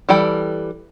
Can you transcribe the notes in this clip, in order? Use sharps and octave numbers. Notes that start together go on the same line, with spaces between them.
E3 G3 A4 G5 B5